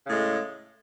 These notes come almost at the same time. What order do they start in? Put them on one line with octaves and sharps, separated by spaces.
C#3 A2 G#3